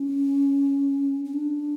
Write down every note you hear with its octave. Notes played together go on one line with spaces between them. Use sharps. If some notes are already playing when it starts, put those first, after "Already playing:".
Already playing: C#4
C#4
D4